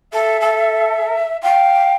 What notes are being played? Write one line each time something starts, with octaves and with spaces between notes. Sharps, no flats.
A4 E5
A4
F5 G5